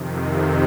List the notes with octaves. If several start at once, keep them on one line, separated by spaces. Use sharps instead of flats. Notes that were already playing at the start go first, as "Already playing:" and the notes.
Already playing: F2 C3 D#3